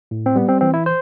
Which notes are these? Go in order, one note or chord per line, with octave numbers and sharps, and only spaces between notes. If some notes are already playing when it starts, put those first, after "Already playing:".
A2
C4
G3 B3
C4
E3 C4
E4
C5